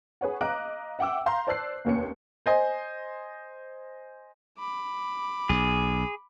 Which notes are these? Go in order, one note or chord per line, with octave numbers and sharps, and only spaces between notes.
G#4 B4 C#5 F#5
D#5 F5 A#5 D6 F#6 D7
E5 F#5 G5 D6 E6
F5 A#5 C6 G6
C5 D5 A5 E6 F#6 C7
F1 D#2 C#4 C#7
C5 D#5 G#5
B5 D6
B1 G#4